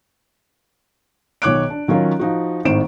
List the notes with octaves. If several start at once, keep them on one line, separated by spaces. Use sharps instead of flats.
B1 D#3 C#5 D6 F#6 D7
D4
D#3 F#3 C#4 F4 A#4 C#5
F3 D#4 F#4
G#1 A2 D#3 C5 D7 E7